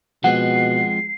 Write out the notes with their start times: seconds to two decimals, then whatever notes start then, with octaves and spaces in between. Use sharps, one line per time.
0.24 B2 F3 G#3 C4 F#5 C7